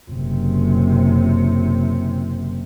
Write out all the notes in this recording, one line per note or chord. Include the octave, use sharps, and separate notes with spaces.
F#1 C3